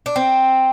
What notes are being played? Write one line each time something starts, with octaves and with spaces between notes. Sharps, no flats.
D4
C4